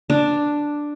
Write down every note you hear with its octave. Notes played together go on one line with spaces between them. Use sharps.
D4